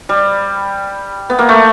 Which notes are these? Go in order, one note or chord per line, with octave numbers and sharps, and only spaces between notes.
G3
B3
A#3
A3